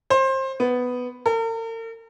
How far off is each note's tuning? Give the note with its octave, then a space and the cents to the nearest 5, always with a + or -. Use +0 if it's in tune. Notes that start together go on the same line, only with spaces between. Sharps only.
C5 +25
B3 +5
A#4 -45